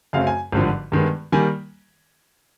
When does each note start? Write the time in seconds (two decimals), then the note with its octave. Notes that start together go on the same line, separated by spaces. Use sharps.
0.13 F#2 C#3 F#3 A3 C4 F5
0.27 G#5
0.52 G#1 G2 D3 F3
0.92 G2 D#3 G#3 B3
1.32 D#3 G3 A#3 G#5